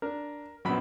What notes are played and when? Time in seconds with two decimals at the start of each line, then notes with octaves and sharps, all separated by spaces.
0.02 D4 A#4
0.65 A#1 F#2 F#3 B3 B5